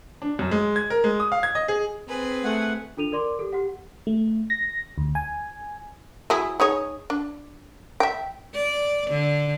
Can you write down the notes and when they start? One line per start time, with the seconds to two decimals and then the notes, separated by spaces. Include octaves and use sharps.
0.22 D4
0.39 F#2
0.51 G#3
0.76 G#6
0.90 A#4
1.04 G#3
1.20 D#6
1.32 F5
1.43 G#6
1.55 D#5
1.68 G#4
2.08 C4 G#4 B4
2.44 A3 F#5
2.97 D4 F4 A4 D#7 F7
3.12 A#4 D5 C6 D6
3.39 G4 A4
3.53 G4 F#5
4.07 A3
4.50 A#6
4.98 D2
5.15 G#5
6.30 F#3 E4 G#4
6.60 D#4 G#4 C#5
7.10 D4
8.00 E5 G5
8.55 D5
9.11 D3